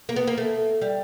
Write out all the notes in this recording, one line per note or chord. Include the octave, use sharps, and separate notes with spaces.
A#3
B3
A#3
A3
G3